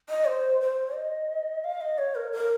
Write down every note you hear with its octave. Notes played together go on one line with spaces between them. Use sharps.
D#5
C5
C5
D#5
F5
D#5
C#5
A#4
A#4